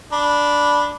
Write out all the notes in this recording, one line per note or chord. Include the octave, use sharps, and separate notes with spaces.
D4 B5